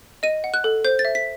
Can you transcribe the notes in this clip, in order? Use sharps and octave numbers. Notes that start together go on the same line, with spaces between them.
D#5 D#7
F#5
F#6
A4
C5 G6
A6
E5
B6